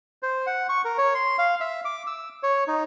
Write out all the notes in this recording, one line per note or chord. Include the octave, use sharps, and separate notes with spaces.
C5
F#5
C#6
A#4
C#5
C6
F5
E5
D6
E6
C#5
D#4